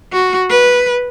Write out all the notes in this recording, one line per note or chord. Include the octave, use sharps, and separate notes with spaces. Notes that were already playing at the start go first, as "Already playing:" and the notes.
F#4
B4